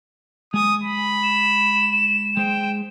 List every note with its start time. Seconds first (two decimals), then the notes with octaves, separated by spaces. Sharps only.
0.54 G#3 G#5 D#6
0.83 B5
1.23 E7
2.37 G#3 C5 G5